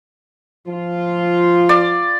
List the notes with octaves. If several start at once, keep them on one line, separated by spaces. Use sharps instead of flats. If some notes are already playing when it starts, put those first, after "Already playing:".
F3 F4
D5